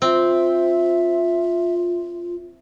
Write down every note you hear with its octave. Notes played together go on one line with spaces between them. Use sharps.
C4 F4 E5